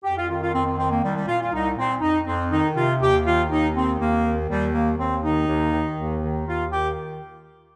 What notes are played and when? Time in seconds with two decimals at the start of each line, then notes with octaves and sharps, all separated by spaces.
0.03 F2 G4
0.16 F4
0.28 D#3 F4
0.41 F4
0.53 F2 C4
0.65 C4
0.77 D#3 C4
0.90 A#3
1.02 C2 G3
1.15 G3
1.27 A#2 F4
1.40 F4
1.52 C2 D#4
1.76 A#2 C4
2.01 F2 D#4
2.26 F2 C4
2.50 D#3 D#4
2.75 C3 F4
3.00 D#2 G4
3.25 D#3 F4
3.49 D#2 D#4
3.74 D#3 C4
3.98 D#2 A#3
4.23 D#3
4.48 D#2 G3
4.72 D#3 A#3
4.97 D#2 C4
5.22 D#3 D#4
5.46 D#2
5.71 D#3
5.96 D#2
6.21 D#3
6.45 D#2 F4
6.70 D#3 G4